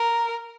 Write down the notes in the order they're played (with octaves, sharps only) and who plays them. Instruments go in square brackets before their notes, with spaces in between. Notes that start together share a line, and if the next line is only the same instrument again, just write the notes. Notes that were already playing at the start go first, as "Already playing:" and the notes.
Already playing: [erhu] A#4